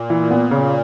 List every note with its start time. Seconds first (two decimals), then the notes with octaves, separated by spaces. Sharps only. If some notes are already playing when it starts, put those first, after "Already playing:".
Already playing: A#2
0.10 E3
0.31 B3
0.51 C#3